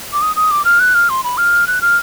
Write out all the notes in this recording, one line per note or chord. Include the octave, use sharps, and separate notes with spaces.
D6
D#6
D#6
D6
F6
F#6
F6
C6
B5
F6
F#6
F6